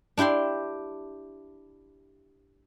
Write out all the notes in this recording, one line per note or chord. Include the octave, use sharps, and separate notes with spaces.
D4 E4 G4 G5 C6